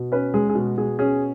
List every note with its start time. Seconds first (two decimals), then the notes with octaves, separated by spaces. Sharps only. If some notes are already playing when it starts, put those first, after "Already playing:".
Already playing: B2
0.12 C#4 B4
0.34 G#3 G#4
0.50 G#4
0.55 B2 F#4
0.77 B2 G#4
0.99 C#4 G#4